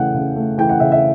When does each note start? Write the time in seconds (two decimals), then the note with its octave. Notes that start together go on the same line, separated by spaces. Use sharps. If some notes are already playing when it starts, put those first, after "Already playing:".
Already playing: C#3 E3 A3 F#5 G5
0.14 C#3
0.36 A3
0.58 E3 G5
0.69 F#5
0.80 C#3 E5
0.92 E5